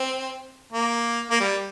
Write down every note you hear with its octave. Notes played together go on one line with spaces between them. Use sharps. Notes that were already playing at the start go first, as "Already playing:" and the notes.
Already playing: C4
A#3
A#3
G3